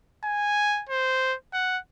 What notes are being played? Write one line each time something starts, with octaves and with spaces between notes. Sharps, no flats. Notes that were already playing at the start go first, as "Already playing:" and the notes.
G#5
C5
F#5